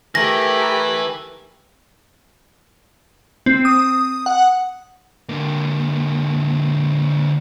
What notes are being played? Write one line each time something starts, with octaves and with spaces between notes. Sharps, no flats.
E3 A3 G4 A#4 G#5 A#6
C4
D#6
F#5
D3 A#3